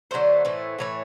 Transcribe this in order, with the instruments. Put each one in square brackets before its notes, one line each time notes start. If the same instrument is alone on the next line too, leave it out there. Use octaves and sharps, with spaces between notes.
[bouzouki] D3 F#3 A3 C5
A2 E3 A3
A2 E3 A3 C#5